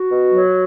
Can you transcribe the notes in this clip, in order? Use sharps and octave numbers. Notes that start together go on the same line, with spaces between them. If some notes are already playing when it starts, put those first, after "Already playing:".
Already playing: F#4
B2
F#3